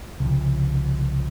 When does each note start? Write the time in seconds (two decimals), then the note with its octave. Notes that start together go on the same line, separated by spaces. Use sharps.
0.20 C2 C#3 F3